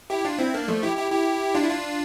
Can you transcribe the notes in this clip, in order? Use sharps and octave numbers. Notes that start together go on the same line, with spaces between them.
E4 G4
D4 F4
C4 E4
A#3 D4
F3 A3
E4 G4
E4 G4
E4 G4
D4 F4
E4
D4 F4